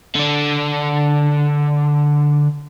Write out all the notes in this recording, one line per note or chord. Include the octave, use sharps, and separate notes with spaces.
D3 D4